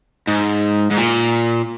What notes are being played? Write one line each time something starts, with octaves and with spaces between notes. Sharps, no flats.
G#2
G#2
A#2